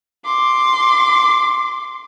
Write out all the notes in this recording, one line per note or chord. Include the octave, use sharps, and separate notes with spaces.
C6 D6